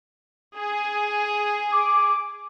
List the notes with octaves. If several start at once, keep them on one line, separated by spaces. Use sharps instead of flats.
G#4
D6